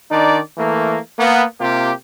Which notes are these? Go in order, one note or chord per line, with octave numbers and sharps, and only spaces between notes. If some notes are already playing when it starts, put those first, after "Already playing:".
D#3 D4 D#4 D5
E3 A3 A#3
A#3 B3
C3 A#3 F4 G4